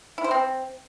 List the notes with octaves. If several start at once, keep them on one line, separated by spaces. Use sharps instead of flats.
E4
C5
C4